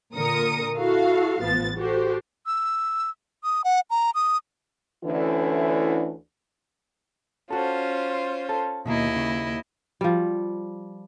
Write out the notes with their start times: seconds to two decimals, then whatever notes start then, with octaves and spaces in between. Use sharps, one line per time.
0.13 A#2 D3 A#4 D#6 C#7
0.76 E4 F#4 A4 F5
1.42 A1 F3 B3 A6
1.76 F#4 G4 A4 C5
2.46 E6
3.44 D#6
3.64 F#5
3.90 A#5
4.15 D#6
5.05 D2 D3 E3 C#4 E4
7.51 C#4 F4 F#4 A4 C5
8.49 A4
8.86 D#2 B2 D#3 A#3 E4 D#5
9.16 C#3
10.01 F3 G3